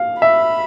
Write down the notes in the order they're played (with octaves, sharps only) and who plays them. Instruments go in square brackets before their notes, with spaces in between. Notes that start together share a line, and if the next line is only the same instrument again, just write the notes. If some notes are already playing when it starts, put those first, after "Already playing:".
Already playing: [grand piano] F5
[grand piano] E5 [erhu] B5